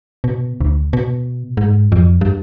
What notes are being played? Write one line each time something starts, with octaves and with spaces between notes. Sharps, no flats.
B2
D2
B2
G#2
F2
G2